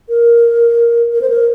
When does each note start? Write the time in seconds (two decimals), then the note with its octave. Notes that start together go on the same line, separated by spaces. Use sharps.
0.09 A#4
1.12 A#4
1.21 C5
1.30 A#4